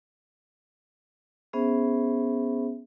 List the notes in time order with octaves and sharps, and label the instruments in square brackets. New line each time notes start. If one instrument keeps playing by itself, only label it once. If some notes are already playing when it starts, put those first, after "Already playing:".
[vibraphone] B3 C#4 G#4 C5 E5